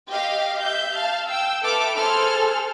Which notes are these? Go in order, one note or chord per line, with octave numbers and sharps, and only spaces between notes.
G4 D#5 F5
E5 G6
F5 A5
G5 E6
A4 B4 E5 D6 F6
G#4 A4 C5 F6